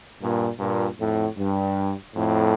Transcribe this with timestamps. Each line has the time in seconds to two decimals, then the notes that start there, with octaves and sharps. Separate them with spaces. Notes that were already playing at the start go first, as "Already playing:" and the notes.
0.21 G2 A#2
0.59 G2 A#2
0.99 F2 A2
1.37 G2
2.15 F2 A2